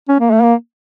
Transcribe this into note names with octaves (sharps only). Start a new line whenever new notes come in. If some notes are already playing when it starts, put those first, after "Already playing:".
C#4
A#3
A3
A#3